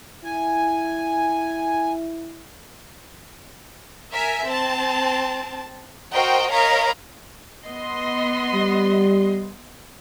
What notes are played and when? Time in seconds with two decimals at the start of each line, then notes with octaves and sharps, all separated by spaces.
0.25 E4 G#5
4.12 A#4 E5 G#5
4.45 C4 A5
6.13 F#4 A#4 C5 D#5 G5
6.51 A#4 C#5 D#5 F5 A#5 B5
7.66 B3 D#5 C6
8.54 G3